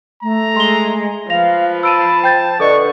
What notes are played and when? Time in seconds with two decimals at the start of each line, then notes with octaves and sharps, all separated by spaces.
0.23 A3 A#5
0.56 G#3 C6 G7
1.30 F3 B4 F5 A#6 F7
1.83 A5 B5 E6 D7 D#7
2.24 C5 G5 G6 A6
2.60 D3 A4 B4 D5 D#5 C#6